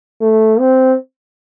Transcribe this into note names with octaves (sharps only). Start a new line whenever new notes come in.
A3
C4